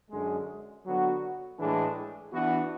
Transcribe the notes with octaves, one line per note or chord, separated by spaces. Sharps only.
F#2 D3 G#3
D3 F#3 B3 F#4
A2 E3 G#3 D4 G#4
E3 B3 D4 F#4